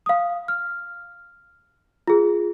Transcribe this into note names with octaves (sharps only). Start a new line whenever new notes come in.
F5 D#6
F6
F4 G#4